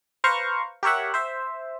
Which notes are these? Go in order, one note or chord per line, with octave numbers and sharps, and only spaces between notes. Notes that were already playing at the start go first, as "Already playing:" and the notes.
B4 C5 F5 A#5 C#6
G4 A#4 C#5 E5 F#5
C5 E5